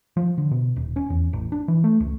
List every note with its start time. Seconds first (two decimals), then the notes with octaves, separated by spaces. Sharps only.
0.17 F3
0.38 D3
0.51 B2
0.76 D#1
0.96 C#4
1.10 E2
1.33 A1
1.52 D4
1.68 E3
1.84 A3
2.00 C#2